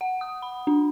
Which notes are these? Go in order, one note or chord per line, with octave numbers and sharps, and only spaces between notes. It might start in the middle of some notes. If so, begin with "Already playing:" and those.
F#5
D#6
B5
D4